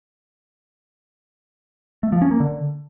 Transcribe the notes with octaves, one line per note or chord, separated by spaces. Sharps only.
A3
F3
C#4
A#3
D3